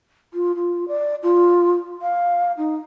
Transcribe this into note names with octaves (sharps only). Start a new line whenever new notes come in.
F4
F4
D5
F4
F5
D#4